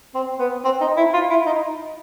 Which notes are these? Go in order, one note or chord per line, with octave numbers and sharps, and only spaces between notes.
C4
B3
C4
D#4
E4
F4
E4
D#4